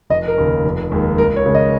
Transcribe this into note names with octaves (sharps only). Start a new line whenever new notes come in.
F1 D#5
A#4
D#2 C#3
F1
D#2 D#3 G#3
C#2 A#4
C#5
C#3 G#3
D#5